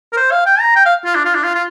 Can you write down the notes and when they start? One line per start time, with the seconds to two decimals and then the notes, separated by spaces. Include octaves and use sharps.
0.13 A#4
0.17 C5
0.32 F5
0.46 G5
0.60 A#5
0.76 G5
0.86 F5
1.05 F4
1.15 D4
1.25 F4
1.35 D4
1.44 F4
1.55 F4